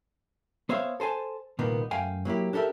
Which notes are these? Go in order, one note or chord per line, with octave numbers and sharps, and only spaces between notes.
B3 C5 C#5 E5 F5
A4 C5 G#5 A5
C2 A#2 D#3 A#3 B3
F#2 A3 F5 G5 G#5
F#3 A#3 E4 G4
D4 G4 A4 A#4 E5